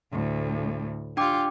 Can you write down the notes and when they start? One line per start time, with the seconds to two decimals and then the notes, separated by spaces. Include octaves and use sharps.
0.12 D2 A2
1.17 D4 F4 G4 G5 D6